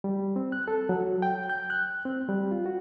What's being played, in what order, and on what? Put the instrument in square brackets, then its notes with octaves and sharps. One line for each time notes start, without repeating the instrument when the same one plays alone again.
[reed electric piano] G3
C4
F#6
A4
F#3
G5
G6
F#6
C4
G3
F4
F#4